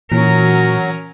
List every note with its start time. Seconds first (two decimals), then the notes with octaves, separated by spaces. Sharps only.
0.12 A#2 E3 F#3 C#4 A#4